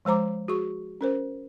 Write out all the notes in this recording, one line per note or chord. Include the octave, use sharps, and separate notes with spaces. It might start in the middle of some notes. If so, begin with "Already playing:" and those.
F3 G#3 C5 A#5 D6
F#4 G#4 C#6
C#4 A#4 C5